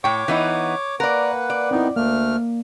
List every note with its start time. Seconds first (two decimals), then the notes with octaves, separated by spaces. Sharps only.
0.04 A2 C#5 G5 C#6 D6
0.28 E3 B3 D#4
1.00 A#3 A#4 B4 D5 F#5
1.50 D5
1.71 D#3 B3 C4 D#4 E4
1.96 D2 A3 A#3 F6